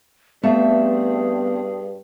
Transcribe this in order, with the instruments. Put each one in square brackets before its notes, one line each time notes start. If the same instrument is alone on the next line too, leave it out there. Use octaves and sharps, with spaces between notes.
[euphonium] G2 [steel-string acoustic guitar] A3 C4 E5 [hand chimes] B3 [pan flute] G#4